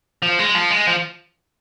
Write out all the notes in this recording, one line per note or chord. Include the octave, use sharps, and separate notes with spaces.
F3
G#3
F3
G#3
F3